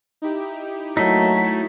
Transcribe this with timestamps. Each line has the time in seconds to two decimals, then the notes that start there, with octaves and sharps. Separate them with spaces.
0.22 D#4 E4 G4
0.97 F#3 A3 A#3 D#4 E4 B6
1.32 E4 F#4 C#5